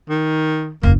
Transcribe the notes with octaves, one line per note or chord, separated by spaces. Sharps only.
D#3
F#1 E2 A#3